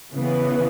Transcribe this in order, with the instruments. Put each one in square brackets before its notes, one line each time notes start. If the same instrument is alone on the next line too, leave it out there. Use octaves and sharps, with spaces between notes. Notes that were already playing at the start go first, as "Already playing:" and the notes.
[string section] C#3 E3 B3